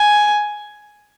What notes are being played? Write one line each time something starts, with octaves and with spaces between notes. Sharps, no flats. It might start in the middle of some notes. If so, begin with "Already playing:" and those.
Already playing: G#5